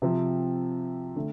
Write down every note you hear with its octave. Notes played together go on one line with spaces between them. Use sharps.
C3 F3 C4
D3 A3 D4